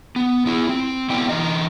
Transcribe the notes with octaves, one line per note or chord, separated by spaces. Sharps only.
B3
B3 E4
C4
B3 E4 D5 G5
D3 E3 D#4 D#5